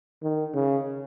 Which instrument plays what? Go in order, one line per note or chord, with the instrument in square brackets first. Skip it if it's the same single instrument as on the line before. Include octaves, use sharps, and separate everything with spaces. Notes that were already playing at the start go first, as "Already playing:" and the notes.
[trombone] D#3
C#3